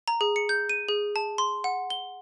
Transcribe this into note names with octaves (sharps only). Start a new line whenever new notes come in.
A#5
G#4
C#7
G6
D#7
G#4
A5
C6
F#5
G7